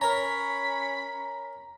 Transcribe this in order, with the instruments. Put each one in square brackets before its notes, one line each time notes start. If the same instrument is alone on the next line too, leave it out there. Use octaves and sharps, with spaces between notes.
[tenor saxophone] C#4 [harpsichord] A#4 C#5 [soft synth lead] A#5 [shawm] B5